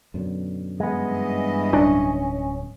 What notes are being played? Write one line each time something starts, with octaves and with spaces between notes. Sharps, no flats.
F#2 B2 D3
G2 E3 G#3 B3 D#5
D1 C#4 D4